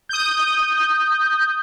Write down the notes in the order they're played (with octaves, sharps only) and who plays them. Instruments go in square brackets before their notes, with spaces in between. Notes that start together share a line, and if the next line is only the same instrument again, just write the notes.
[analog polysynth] D#6 G6